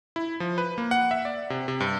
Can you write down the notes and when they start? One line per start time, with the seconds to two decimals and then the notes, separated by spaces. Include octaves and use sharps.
0.16 E4
0.40 F3
0.58 B4
0.78 A#3
0.91 F#5
1.11 E5
1.25 D5
1.50 C3
1.68 C3
1.80 G2